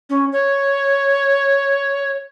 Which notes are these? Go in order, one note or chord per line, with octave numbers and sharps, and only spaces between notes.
C#4
C#5